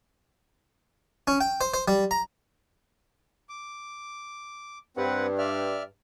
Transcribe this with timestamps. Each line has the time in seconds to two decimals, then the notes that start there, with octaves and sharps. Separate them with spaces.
1.27 C#4
1.41 G5
1.61 C5
1.74 C5
1.88 G3
2.11 A#5
3.49 D6
4.97 G2 C4 B4 F#5
5.38 D5 E5 F6